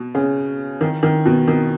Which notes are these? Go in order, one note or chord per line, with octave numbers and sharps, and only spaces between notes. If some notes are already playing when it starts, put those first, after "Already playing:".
Already playing: B2
C#3
D#3
D#3
B2
D#3